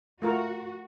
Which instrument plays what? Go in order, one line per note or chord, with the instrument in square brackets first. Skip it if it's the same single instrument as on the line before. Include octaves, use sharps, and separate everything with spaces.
[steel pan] A3 F4 A#4 [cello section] F#4